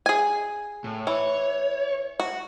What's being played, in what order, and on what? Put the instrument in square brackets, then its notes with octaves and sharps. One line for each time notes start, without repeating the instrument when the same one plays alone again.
[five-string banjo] G#4 G#5
[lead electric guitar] A2
[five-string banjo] E3 [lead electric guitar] C#5
[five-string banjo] F#4